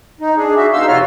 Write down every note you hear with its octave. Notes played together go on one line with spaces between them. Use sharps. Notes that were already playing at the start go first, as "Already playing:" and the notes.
D#4
D4 G#4
F#4 E5
B2 D#4 F5 C6 E6
F2 C3 F4 F#4 C#5 F6